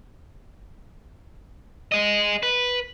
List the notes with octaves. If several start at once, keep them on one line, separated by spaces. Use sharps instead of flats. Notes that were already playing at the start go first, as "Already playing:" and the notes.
G#4 D#5
B4